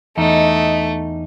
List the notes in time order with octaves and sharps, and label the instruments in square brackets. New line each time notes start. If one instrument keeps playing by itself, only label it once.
[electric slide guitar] E2 D#4 [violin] A3 [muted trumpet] D#5